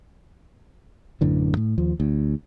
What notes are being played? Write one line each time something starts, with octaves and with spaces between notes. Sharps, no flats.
A1 F#2 D3 E3
A2
D#2 F3
D2